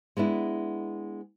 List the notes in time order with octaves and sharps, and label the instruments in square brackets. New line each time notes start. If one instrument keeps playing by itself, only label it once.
[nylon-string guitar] G#3 B3 D4 E4